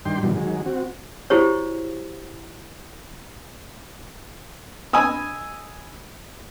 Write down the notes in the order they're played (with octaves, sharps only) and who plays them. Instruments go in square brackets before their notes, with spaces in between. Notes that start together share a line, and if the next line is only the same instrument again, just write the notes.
[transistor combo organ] G2 D#3 D4 G5 C6
G2 B2 D#3 E3 F#3 G3
D#3 F#3 G#3
C4 F#4
[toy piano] E4 F#4 G4 C5 C#5
[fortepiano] D#5 G#5 B5 D#6 E6